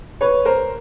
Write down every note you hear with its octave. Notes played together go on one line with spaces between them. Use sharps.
B4 C#5
A#4 C5